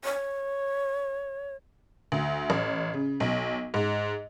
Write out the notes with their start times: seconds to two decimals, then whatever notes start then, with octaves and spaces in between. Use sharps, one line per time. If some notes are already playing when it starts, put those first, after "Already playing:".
0.04 C#5
2.12 D2
2.50 A1
2.93 C#3
3.20 B1
3.74 G#2